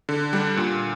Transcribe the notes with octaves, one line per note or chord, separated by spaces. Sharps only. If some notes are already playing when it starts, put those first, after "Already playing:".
D3
G3 D4
A#2